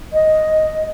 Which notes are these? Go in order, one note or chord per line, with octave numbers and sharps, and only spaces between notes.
D#5